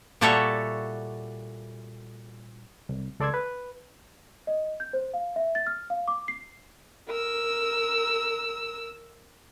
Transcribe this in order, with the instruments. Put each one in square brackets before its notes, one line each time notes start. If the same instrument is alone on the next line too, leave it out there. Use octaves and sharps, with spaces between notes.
[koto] A#2 G3 F#4 A4 C#5 E5
[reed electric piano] C2
C#2 A4 D5 C6 E6 G#6
B4
[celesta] D#5
G6
C5
F5
E5
A6
F6
F5
D6
C7
[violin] A#4 E6